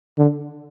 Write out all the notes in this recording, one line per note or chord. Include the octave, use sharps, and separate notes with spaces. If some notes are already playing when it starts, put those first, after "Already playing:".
D3